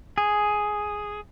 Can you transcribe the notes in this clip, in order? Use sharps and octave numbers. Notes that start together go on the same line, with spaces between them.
G#4